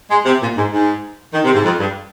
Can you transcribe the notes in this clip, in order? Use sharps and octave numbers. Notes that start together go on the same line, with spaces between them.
G#3
C3
A#2
G#2
G#2
D#3
C3
G#2
F2
G2